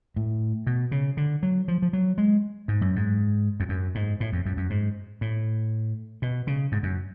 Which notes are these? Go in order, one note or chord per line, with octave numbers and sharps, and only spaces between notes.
A2
B2
C#3
D3
F#3
F3
F3
F#3
G#3
G#2
F#2
G#2
F2
F#2
G#2
A2
F2
F#2
F#2
G#2
A2
B2
C#3
G#2
F#2